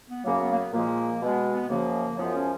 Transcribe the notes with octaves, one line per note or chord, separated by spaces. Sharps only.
B3
F#2 C#3 F#3 A#3
B3
A#3
B3
A#2 F3 G#3 A#3
B2 G#3 B3
B3
F#2 C#3 F3 A#3
F#2 F3 G#3 B3
C#4